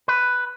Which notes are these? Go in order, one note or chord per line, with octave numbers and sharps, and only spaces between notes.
B4